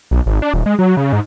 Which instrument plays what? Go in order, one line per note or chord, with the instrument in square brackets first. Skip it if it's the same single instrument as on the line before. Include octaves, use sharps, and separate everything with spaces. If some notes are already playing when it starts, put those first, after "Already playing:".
[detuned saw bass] B1
G#1
D4
D#1
G#3
F#3
C#3
G#2